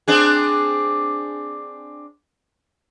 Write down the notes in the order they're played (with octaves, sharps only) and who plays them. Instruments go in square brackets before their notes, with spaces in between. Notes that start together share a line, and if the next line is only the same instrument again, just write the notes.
[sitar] C4 D4 G#4